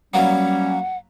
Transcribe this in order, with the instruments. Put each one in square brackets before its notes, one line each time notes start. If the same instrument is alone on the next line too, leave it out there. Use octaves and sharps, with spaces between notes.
[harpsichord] F#3 A#3 B4 [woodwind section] G3 C#4 [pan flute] F#5